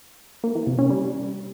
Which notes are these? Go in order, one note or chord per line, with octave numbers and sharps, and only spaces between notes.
A#3
E3
C3
C#4
G3